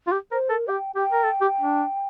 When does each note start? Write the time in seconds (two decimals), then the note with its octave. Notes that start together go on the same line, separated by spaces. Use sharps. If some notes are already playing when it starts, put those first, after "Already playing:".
0.07 F4
0.12 G4
0.31 A#4 C5
0.50 A4 A#4
0.68 G4 G5
0.95 G4 G5
1.12 A#4
1.24 A4
1.41 G4
1.61 D4